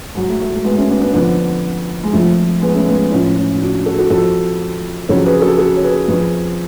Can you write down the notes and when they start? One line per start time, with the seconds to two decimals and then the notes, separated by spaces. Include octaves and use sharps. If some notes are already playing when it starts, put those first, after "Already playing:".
0.15 G#2 F#3 G#3
0.28 A3
0.40 A3
0.52 A3
0.64 G#3 B3
0.77 A3 C#4
0.90 B3 D4
1.01 B3 D4
1.13 F2 D3 F3 B3 D4
2.03 G#3
2.13 F2 F3 A3
2.61 G#3 B3
2.74 A3 C#4
2.86 G#3 B3
3.11 A2 F3 C#4 F4
3.36 C#4 F4
3.55 F4
3.61 D4 F#4
3.86 F#4 A4
3.98 F#4 A4
4.10 F2 F3 F#4 A4
5.09 F2 C#3 F#3 A4 C#5
5.25 G#4 B4
5.42 F#4 A4
5.58 F#4 A4
5.76 C#5
5.83 G#4 B4
6.08 F2 F3 G#4 B4